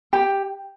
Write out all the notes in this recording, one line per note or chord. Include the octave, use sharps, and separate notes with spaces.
G4